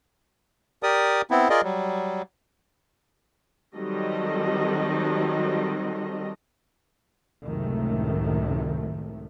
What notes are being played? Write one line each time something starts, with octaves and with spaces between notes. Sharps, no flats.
G4 A#4 D5 D#6
B3 C4 E4
F4 G#4 A#4 D5 D#5
F#3 G3
D#3 F#3 G3 C4 A4 D#5
C#2 F#2 A2 C3 D#3 A3